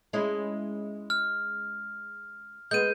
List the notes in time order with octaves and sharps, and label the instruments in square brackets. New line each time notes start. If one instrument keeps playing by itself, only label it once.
[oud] G#3 C#4 E4
[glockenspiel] F6
[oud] G#3 B3 [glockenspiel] G6 D#7